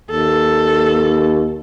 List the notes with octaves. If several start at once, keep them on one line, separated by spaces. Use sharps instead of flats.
D#2 A4